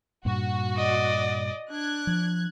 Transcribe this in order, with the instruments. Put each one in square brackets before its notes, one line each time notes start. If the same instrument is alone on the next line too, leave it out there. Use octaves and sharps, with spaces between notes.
[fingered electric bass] G2 A#2 [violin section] F#4
[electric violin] D5 D#5
[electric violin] D4 [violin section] F#6 G#6
[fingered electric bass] F3